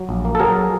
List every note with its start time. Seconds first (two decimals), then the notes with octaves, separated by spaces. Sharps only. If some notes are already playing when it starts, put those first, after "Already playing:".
Already playing: F#3
0.09 A#1
0.25 A#3
0.35 A4
0.40 F#3 G#4 A#4